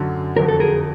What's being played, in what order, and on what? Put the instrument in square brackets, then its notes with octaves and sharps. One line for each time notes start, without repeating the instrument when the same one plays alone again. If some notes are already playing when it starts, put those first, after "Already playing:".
Already playing: [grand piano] F#2 D3 F#3
[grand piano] F2 D3 F#3 [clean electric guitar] A#4
[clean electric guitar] A4
G#4 A#4